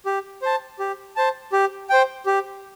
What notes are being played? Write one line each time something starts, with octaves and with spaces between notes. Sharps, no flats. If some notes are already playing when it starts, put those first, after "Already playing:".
G4
C5 A5
G4
C5 A5
G4
C5 G5
G4